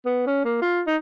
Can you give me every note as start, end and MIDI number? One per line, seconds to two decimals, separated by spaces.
0.05 0.22 59
0.26 0.42 61
0.45 0.58 58
0.62 0.81 65
0.87 0.96 63